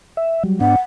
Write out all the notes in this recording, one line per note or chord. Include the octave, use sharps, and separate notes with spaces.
E5
F#3 G3
G#2 B3 D4 F#5